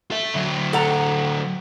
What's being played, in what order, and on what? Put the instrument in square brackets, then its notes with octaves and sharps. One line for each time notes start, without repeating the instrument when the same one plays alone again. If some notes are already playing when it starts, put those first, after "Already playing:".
[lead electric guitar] A4 E5
D3 F#3
[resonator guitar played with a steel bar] A4 F#5 A#5